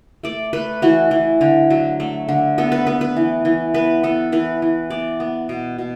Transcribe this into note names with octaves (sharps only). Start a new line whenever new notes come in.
A3 D5
A3 B4
E3 F#4
E3
D3
F#3
A3
D3
B3 A4
B4
B3 B4
B4
E3
E3
B3 B4
B3 A4
E3 B4
E3
B3 D5
B3
B2
B2